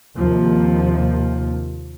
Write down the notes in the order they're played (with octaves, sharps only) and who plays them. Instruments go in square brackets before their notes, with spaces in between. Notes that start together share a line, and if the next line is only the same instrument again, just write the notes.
[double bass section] D#2 C3 F3